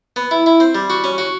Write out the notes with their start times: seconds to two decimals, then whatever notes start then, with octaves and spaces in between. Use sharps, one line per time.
0.16 B3
0.31 E4
0.46 E4
0.60 C4
0.75 G3
0.90 F#4
1.04 C#4
1.18 F#4